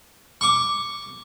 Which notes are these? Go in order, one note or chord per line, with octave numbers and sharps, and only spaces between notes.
C#6 D6